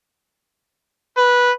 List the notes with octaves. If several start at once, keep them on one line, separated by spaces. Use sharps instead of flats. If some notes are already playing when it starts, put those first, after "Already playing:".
B4